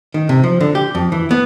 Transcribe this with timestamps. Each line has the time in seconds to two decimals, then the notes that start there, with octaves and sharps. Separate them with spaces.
0.14 D#3
0.29 C3
0.44 F3
0.61 D3
0.75 G4
0.95 F2
1.12 E3
1.31 B3